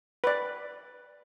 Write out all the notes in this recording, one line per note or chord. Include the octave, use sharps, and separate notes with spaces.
B4 D5